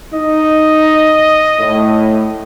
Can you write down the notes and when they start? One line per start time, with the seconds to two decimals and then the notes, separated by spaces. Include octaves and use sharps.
0.14 D#4 D#5
1.60 A2